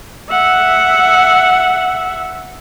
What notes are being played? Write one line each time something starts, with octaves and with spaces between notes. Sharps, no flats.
E5 F#5